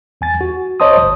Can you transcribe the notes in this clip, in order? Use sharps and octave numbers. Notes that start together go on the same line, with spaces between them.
E2 G#5 A6
F#4
C5 C#5 D#5 A5 C6 D#6
G1 D#6